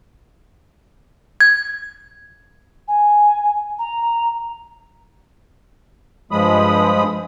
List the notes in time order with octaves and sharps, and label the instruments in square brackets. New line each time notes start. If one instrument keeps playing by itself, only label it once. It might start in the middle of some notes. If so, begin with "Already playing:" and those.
[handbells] G#6
[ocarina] G#5
A#5
[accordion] G2 F3 G#3 B5 D#6